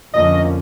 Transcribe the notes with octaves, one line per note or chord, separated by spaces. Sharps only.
F2 D3 F3 A#3 C#4 D#5